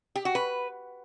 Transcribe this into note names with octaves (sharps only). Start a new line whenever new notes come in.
G4
F#4
B4